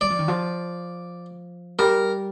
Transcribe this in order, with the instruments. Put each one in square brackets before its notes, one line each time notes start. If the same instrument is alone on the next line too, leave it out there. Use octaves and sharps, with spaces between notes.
[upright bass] G3 [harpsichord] D5
[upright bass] F3
D#3
F3
[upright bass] G3 [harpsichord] A#4